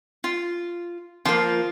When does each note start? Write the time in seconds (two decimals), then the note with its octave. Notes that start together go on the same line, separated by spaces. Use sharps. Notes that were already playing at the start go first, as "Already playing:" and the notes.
0.24 F4
1.25 F3 A#3 F4